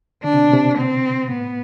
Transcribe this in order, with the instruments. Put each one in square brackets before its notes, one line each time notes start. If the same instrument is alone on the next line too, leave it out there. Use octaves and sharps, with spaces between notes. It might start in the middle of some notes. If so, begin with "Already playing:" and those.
[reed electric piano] D3 [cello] D4
[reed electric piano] C3
B2
C3
[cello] C4
[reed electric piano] A2 [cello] B3